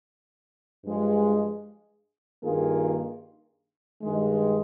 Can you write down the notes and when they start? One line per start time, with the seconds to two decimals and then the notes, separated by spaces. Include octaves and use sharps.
0.84 G2 F3 G#3
2.44 G2 D#3 A#3 F4 G#4
4.02 G2 D#3 G#3